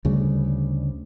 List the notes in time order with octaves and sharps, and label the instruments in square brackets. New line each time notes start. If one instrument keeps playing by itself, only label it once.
[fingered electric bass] D2 C#3 G3